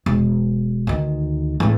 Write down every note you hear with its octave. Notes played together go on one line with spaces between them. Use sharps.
E1
D2 D#3
E2 A2